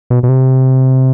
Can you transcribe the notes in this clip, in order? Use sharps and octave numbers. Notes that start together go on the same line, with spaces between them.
B2
B2
C3